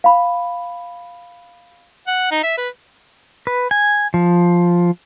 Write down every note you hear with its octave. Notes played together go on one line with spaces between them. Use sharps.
F5 B5
F#5
D#4
E5
B4
B4
G#5
F3